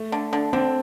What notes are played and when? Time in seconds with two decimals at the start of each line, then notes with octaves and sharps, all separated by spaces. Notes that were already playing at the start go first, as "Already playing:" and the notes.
Already playing: A3
0.12 D3
0.33 D3
0.53 D3 C4